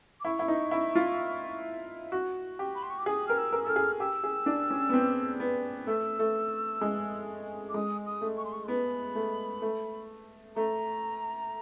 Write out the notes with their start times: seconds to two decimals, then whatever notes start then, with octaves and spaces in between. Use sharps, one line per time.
0.20 D6
0.25 E4 C#6
0.39 E4
0.48 D#4
0.71 E4
0.95 F4
2.12 F#4
2.59 G4
2.75 B5
2.82 C6
2.90 C#6
2.98 D6
3.06 G#4 D#6
3.27 A#4 F6
3.38 E6
3.52 A#4
3.64 A4 E6 F6
3.76 G#4
4.00 G4 E6
4.24 G#4
4.46 D4
4.70 C#4
4.89 B3
4.94 C4
5.40 B3
5.87 A3 E6
6.19 A3
6.81 G#3
7.69 D6
7.74 G#3 D#6
8.06 D#6
8.21 A3
8.37 C#6
8.45 C6
8.52 C#6
8.64 C6
8.68 B3 B5
9.15 A3
9.62 A3
10.56 A3 A#5